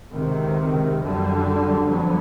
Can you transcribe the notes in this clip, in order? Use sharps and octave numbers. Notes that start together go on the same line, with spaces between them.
C#2 C3 D#3
F#2 D3 G3
F2 D3 F#3 B3